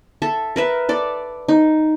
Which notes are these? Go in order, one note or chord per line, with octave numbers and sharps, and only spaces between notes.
A4 E5
A#4 B4 E5
A4 D5
D#4